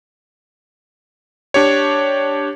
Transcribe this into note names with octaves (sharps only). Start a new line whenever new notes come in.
D4 G4 C#5